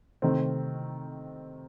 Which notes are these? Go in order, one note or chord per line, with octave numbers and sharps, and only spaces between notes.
C3 D#3 A3 C4